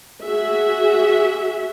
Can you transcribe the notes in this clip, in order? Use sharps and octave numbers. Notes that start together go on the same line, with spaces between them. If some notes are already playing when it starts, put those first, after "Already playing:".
F#4 G#4 E5